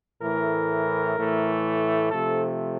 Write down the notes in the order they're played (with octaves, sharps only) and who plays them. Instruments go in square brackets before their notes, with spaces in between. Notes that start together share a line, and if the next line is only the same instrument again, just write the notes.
[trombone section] A2 E3 A3 A#4
A2 E3 A3
C3 F3 A3 A4